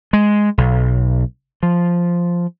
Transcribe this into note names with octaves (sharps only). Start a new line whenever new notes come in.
G#3
B1
F3